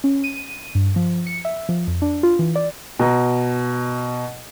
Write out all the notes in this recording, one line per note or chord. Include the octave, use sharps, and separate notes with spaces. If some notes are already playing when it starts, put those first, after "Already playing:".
C#4
D#7
G2
F3
C#7
E5
F3
F2
D4
F4
E3
D5
B2 A#5